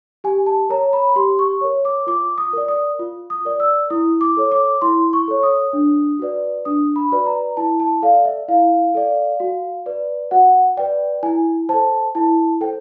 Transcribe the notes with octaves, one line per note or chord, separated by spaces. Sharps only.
G4 G#5
A5
A#4 C#5 A#5
B5
G4 C6
C#6
A#4 C#5
D6
F4 D6
D#6
A#4 D5
D#6
F4
D#6
A#4 D5
E6
E4 D#6
D6
A4 C#5
D6
E4 C6
C#6
A4 C#5
D#6
D4
F#4 B4 D5
D4 D#6
B5
F#4 B4 D5
A#5
E4 A5
A5
A4 D5 F5
E5
E4 F5
A4 D5
F#4
B4 D5
F#4 F#5
B4 D5 G5
E4 G#5
A4 C5 A5
E4 A5
A4 C5 G5